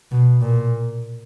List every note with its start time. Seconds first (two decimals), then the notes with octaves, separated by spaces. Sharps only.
0.12 B2
0.41 A#2